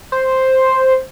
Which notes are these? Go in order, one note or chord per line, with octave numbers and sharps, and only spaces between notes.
C5